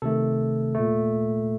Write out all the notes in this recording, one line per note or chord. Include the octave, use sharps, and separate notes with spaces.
C3 D#3 A3 A4
A#2 A3